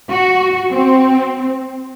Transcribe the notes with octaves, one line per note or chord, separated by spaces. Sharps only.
F#4
C4